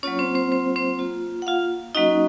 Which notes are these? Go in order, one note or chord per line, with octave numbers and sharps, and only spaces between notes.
F#3 A#3 C#4 F4 C#5
C4 C5
C4 C5
C4 C5
C4 C5
A#3 F4
F#5
F4 F5
F#3 A#3 C#4 D#4 F#4 D#5